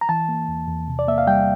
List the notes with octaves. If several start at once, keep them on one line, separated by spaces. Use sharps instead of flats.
A#5
E3 A5
A#3
E2
E2
C3
D5
A#3 E5
F5
G3 G5